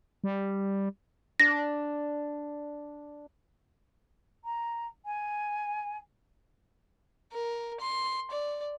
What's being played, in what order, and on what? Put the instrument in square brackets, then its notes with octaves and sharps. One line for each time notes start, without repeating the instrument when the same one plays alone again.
[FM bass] G3
[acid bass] D4 [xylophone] A#6
[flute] A#5
G#5
[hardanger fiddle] A#4
C6
D5